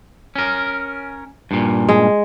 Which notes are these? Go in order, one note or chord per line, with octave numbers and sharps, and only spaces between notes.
C#4 A#4
G2 A#2
G#3